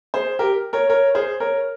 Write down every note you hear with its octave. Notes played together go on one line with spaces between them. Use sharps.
G#4 C5
G4 A#4
A#4 C#5
A#4 C#5
G#4 C5
A#4 C#5